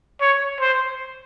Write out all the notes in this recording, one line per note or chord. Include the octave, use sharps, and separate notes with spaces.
C#5
C5